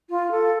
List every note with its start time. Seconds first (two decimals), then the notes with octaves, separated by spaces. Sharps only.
0.09 F4
0.30 A4